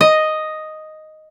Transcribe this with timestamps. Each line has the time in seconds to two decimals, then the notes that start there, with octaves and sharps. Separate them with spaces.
0.01 D#5